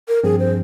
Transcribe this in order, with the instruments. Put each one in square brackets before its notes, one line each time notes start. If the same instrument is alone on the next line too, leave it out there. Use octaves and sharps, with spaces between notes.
[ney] A#4
[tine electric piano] G2 F3 C4 [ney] G#4
[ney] C5